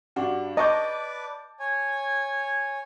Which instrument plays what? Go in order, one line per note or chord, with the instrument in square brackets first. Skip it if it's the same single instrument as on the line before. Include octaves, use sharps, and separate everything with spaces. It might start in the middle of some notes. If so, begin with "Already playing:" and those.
[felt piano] G2 D4 F#4
[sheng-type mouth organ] B4 D5 [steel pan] D#5 C#6 [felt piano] A5 D6 G6
[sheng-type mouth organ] C#5 G#5